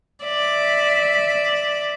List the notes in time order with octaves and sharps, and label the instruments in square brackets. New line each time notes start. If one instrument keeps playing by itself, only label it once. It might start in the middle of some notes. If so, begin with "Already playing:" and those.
[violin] D5 [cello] E5